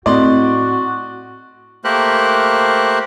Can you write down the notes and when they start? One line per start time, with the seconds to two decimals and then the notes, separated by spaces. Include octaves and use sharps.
0.06 A2 C4 F#4 D5 D#5 C6
1.84 A3 A#3 G4 A#4 C5 F#6